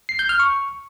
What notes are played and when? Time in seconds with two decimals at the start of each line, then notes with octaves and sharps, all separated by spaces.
0.09 C7
0.19 G6
0.29 F6
0.39 C#6